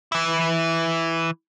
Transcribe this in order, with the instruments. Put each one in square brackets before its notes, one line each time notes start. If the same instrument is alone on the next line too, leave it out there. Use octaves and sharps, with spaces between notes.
[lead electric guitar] E3 E4